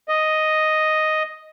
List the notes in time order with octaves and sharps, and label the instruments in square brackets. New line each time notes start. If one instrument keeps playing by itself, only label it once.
[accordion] D#5